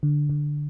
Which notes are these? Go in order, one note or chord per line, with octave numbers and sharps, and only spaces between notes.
D3
D3